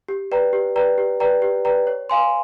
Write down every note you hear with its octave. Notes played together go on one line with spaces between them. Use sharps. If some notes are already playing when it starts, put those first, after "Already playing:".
G4
B4 D5 G5 A#5
G4
B4 D5 G5 A#5
G4
B4 D5 G5 A#5
G4
B4 D5 G5 A#5
C#5
F5 G#5 C6